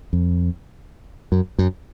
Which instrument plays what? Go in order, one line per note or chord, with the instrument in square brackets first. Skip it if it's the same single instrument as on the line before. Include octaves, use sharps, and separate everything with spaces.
[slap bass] F2
F#2
F#2